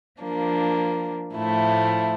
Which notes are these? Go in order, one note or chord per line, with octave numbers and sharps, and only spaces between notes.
F3 A#3 D4
A2 F3 A3 E4